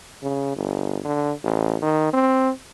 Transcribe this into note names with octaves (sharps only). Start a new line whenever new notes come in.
C#3
G1
D3
A1
D#3
C4